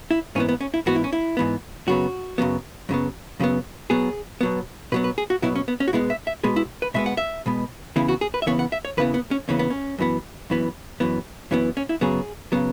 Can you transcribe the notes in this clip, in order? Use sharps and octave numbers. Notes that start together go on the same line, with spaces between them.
E4
G#2 E3 B3 C#4
B3
C#4
E4
G#2 E3 B3 F#4
E4
C#4
E4
G#2 E3 B3
F#2 C#3 F#3 B3 F#4
F#2 C#3 F#3 B3
F#2 C#3 F#3 B3
F#2 C#3 F#3 B3
B2 F#3 B3 G#4
B2 F#3 B3
B2 F#3 B3 B4
B4
G#4
F#4
B2 F#3 B3 E4
C#4
B3
C#4
F#4
B2 G#3 B3 E4
E5
E5
B2 G#3 B3 G#4
E4
B4
B2 G#3 B3 E5
F#5
E5
B2 G#3 B3
E2 C#3 E3 B3 E4
F#4
G#4
B4
E5
E2 C#3 E3 B3 C#5
F#5
E5
C#5
E2 C#3 E3 B3 B4
B3
C#4
E2 C#3 E3 B3 C#4
B3
C#4
F#2 E3 B3
F#2 E3 B3
F#2 E3 B3
F#2 E3 B3 C#4
C#4
E4
F#2 C#3 F#3 B3 G#4
C#3 F#3 B3